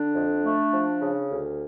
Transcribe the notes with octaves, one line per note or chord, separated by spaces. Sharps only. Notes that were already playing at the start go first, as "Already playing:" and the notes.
Already playing: D3 D4
F2
A3
F3
C#3
D2